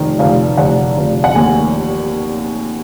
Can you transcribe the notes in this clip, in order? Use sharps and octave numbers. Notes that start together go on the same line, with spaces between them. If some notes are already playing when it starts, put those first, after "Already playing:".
Already playing: F1 D#3
F1 F5
F1 F#5
F1
F#5
D#2 G#5